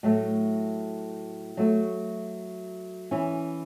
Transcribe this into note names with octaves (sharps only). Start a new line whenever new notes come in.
A2 F#3 A3
F#3 A3 F#4
E3 C#4 E4